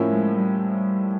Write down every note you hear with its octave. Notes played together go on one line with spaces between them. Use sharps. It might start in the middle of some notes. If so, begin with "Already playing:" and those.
Already playing: A2 F3 A#3 C#4 E4
G#3
G3